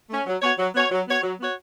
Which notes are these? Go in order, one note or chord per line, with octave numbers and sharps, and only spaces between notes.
A3 C#4
F#3
B3 F#4 C#5
F#3
B3 F#4 C#5
F#3
B3 F#4 C#5
F#3
B3 F#4 C#5